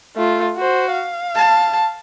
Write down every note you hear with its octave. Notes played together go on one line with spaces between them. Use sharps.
A3 F4
F#4 C5
F5
A5